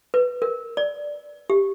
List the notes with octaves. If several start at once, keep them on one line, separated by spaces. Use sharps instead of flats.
B4
A#4
D5
G4